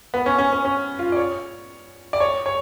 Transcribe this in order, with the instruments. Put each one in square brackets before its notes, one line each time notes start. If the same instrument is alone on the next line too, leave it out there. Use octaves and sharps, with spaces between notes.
[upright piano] B3
C#4
C#4
C#4
C#4
F4
D5
C#5
D5
C#5
C#5